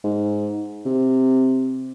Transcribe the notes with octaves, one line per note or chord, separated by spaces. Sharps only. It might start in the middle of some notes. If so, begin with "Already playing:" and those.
G#2
C3